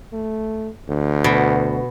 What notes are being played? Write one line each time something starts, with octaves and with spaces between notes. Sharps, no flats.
A3
D2
B2